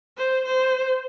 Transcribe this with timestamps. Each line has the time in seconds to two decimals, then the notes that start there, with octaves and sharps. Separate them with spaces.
0.17 C5
0.45 C5